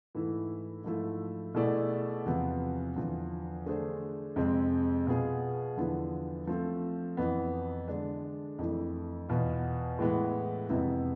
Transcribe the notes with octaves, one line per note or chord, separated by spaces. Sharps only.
G#2 E3 A3 E4
G#2 F3 A3 E4
B2 A3 E4 G#4 D5
E2 C3 F3 B3
E2 D3 F3
D3 A3 D4 G#4 C5
F2 C3 G#3 C4
B2 B3 F4 G#4
E2 D3 F3 B3 E4
F3 A3 C4
F2 E3 B3
D3 G#3 D4
F2 E3 A3 E4
E2 B2 B3 F4
A2 E3 G#3 B3
F2 C3 G#3 B3 E4